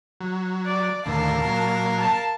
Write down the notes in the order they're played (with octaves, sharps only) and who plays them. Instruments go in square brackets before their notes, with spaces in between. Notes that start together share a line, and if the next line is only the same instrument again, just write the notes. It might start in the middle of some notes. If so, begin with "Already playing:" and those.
[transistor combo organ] F#3
[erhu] D5
[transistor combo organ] D#2 A2 D3 [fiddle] A#4 F5 [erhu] A5
[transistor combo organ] A#2 F#3
[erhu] A5